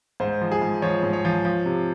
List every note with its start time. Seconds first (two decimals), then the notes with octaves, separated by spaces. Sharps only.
0.20 G#2 C5
0.41 F3
0.52 G#4
0.62 G#2
0.82 F3 C#5
1.03 G#2
1.13 C#5
1.25 F3
1.45 F3
1.66 C3